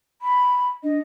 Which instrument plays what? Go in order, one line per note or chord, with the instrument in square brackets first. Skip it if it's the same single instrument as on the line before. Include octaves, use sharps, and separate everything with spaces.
[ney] B5
[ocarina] D4 [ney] D#5